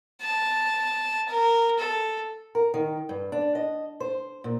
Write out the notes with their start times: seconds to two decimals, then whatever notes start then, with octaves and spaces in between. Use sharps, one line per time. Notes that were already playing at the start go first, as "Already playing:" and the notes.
0.22 A5
1.29 A#4
1.79 A4
2.55 A#4
2.74 D#3
3.09 G2
3.32 D4
3.55 D#5
4.00 C5
4.44 A#2